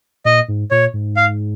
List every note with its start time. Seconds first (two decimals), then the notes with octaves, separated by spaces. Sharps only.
0.25 A#2 D#5
0.48 G#2
0.71 A#2 C#5
0.93 G#2
1.16 F5